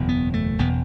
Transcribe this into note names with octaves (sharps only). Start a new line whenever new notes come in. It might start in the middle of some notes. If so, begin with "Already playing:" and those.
Already playing: F#1 E2 B2
B3
A3
F#1 E2 B2 B3